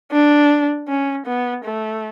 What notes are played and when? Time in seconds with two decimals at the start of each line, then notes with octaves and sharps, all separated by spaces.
0.12 D4
0.89 C#4
1.27 B3
1.65 A3